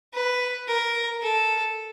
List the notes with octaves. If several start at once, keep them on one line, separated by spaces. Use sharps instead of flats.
B4
A#4
A4